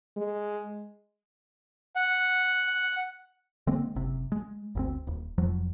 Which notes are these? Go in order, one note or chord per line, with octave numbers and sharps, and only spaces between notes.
G#3
F#5
D3 G#3 A#3 C4
F#1 C3
G#3
G1 D2 C4
D#1
F1 F2 F3 F#3